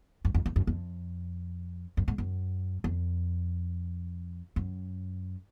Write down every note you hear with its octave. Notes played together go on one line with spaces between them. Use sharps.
F#2
F2
F2
F#2
F2
F#2
G#2
F#2
F2
F#2